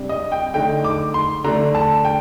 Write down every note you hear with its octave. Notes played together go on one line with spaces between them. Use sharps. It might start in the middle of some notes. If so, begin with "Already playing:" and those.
Already playing: C3 G3 D4
D#5
G5
D3 A3 D#4 G5
D6
C6
D3 A3 D4 A#5
A5
G5